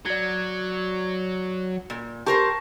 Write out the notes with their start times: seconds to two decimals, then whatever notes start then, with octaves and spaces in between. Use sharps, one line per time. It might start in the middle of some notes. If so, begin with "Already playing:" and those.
0.06 F#3 D5 G#6
1.90 A#2
2.26 G4 A#4 C5 A5 C#6